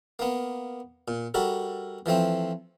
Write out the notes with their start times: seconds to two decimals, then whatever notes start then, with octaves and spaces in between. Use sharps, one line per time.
0.19 A#3 B3
1.08 A#2
1.34 G3 F#4 A4 A#4
2.06 E3 F3 A3 C4